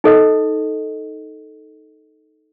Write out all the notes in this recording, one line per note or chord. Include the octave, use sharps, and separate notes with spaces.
D#4 A4 D#5